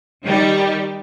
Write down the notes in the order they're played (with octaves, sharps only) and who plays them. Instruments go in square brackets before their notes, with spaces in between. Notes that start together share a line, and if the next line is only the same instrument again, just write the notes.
[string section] D#3 G3 G4